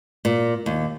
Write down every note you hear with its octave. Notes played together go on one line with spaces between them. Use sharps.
A#2
D#2